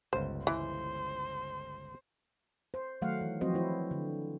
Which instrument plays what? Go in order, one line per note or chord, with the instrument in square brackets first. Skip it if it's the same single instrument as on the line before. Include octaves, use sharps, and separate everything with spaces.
[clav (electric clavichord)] G1 C#2 [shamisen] C5
[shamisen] E3 [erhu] C5
[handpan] C5
D#3 F#3 A3 F5 F#5
E3
F3 F#3 C4 F#4 C5 D#5
E3 E4 C5
D3